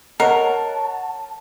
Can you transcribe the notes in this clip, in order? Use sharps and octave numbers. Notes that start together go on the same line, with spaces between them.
A#4 C#5 D#5 F#5 A5